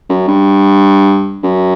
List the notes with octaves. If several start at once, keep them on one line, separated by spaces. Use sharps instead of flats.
F#2
G2
F#2